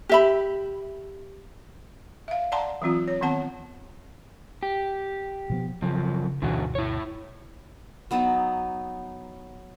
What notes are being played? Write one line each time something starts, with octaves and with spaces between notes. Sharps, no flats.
G4 E5 B5
E5 F5
D5 F#5 A5 A#5 C6
E3 F#3 C4 F4
C#5
D#3 B3 C4 F#5 A5
G4
B2 F3 B3
F#2 C#3 F3
D2 G2 B2 D3 E3 F#4
E4 C#5
F#3 B3 D#4 A5